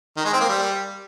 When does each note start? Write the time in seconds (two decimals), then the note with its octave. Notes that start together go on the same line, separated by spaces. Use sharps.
0.17 D#3
0.25 G#3
0.33 C4
0.41 A#3
0.49 G3